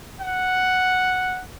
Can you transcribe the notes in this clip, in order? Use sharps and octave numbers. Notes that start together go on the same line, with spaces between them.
F#5